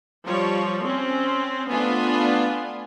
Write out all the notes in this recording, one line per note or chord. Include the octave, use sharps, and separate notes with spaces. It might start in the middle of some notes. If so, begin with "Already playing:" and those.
F3 G3 C#5
C4 C#4
A3 B3 D4 F4 G#5